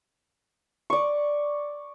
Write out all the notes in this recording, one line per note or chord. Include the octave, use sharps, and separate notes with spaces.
D5 C#6